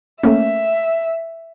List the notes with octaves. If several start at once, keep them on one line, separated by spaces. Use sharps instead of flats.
A3 A#3 C#4 E5